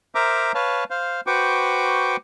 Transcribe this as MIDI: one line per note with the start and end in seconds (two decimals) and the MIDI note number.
0.15 0.52 70
0.15 0.52 72
0.15 0.52 76
0.15 0.52 82
0.15 0.52 86
0.54 0.84 71
0.54 0.84 73
0.54 0.84 77
0.54 0.84 81
0.90 1.21 72
0.90 1.21 77
1.27 2.17 66
1.27 2.17 71
1.27 2.17 72
1.27 2.17 79
1.27 2.17 85
1.27 2.17 86